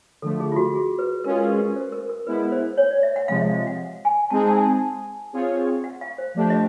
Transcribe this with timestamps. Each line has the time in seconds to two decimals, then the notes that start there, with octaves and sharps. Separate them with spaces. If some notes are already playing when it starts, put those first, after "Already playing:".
0.22 D3 F3 A3 A4
0.40 G#4
0.52 F4
0.56 F#4
0.74 G#4
0.99 B4
1.24 G#3 C#4 F4 G#4 A#4
1.43 A#4
1.50 B4
1.76 C5
1.92 A#4
2.10 A#4
2.27 G#3 B3 E4 B4
2.52 C5
2.77 C#5
2.91 D5
3.03 E5
3.16 F#5
3.28 C3 F3 G#3 F5
3.36 D#5
3.41 E5
3.54 F5
3.67 F#5
4.05 G#5
4.30 G#3 C4 D#4 G#4 A5
4.47 A5
4.57 G#5
5.33 C4 F4 G#4 C#5
5.84 F#5
6.01 F5
6.18 C5
6.35 F3 A3 D4 G4
6.50 D#5